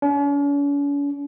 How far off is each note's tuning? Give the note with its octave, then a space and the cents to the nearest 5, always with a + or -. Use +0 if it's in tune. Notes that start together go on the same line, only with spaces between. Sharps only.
C#4 +45